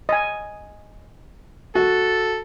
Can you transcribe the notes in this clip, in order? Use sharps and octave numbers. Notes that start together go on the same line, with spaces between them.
D#5 G#5
F#4 A4